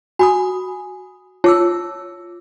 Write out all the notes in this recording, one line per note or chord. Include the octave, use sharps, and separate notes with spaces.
F#4 G#5 B5 D#6
F4 C#5 A5 D6 E6